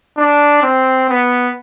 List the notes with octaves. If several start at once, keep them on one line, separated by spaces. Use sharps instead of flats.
D4
C4
B3